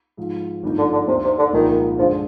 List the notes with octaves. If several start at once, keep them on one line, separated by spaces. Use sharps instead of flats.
G#2 F3 G#3
G#1 G2 F3 A#3 D#4
D3
D3
D#2 C3 D#3 A#3 D4
C3
D3
C2 A#2 D#3 F3 G#3 D#4
G2 D3 F3 G#3 D4